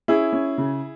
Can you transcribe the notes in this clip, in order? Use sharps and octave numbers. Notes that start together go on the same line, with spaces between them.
C#4 E4 G#4
C#4
C#3